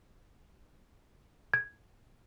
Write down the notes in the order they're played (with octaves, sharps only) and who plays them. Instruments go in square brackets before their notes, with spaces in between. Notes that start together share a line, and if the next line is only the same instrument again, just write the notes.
[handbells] G#6